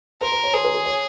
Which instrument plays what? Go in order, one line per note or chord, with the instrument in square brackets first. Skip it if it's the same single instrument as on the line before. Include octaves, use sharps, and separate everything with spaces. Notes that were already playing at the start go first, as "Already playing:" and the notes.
[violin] A#4 [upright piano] C5
[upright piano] C5
C#5
[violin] G#4 [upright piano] C5
[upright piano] A#4
A#4
C#5